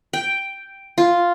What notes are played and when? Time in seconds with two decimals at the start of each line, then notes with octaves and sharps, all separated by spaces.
0.13 G5
0.98 F4